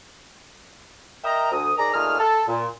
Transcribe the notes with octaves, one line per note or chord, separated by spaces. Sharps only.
A#4 D#5 E5 G5 A#5
D2 D#6
G#2 G#4 A#4 D5 A#5
A#2 A3 D#4 G#4 D#6 F6
A4
A#2